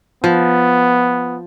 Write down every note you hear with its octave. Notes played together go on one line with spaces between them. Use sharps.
F3 B3